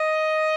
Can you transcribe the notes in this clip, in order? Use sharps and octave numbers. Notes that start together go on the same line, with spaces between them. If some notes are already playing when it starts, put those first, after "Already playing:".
Already playing: D#5